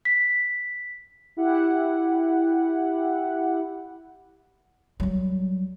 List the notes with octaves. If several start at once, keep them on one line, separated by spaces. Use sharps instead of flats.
B6
E4 G4 F#5
F#3 G3